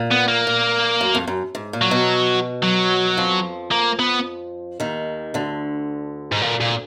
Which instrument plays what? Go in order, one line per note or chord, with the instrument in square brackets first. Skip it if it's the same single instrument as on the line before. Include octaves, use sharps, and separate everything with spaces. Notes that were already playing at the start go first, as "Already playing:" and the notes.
Already playing: [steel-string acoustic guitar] A#2
[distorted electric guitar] B3
A#3
[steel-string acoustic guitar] A#2
F#2
F2
F#2
G#2
A#2
[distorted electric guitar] F#3
[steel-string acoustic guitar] B2
[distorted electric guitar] F#3
[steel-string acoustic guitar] F2 F3
[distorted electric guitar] A#3
B3
[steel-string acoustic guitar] D#2 D#3
D2 D3
[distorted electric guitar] G#2
A#2
A#2